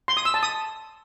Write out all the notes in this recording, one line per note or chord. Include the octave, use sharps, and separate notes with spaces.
C6
D#6
E6
A5
D#6